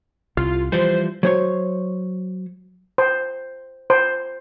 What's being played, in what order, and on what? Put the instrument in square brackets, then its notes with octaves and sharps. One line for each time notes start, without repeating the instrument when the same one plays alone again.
[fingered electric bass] C2 [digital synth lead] F4
[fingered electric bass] E3 F3 G3 [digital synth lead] C5
[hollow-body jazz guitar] F#3 C5 C#5
[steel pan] C5
C5